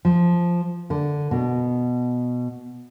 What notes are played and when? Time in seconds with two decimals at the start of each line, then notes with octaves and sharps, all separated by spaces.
0.05 F3
0.90 D3
1.31 B2